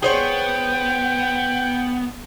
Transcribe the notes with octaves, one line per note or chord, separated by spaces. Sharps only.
B3 G#4 C5 C#5 G5